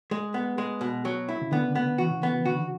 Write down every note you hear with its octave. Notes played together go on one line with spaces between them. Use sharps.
G#3
B3
G#3
B2
F#3
E4
C#3
D3 B3
B3
E3 F#4
C#3
B3
D3 F#4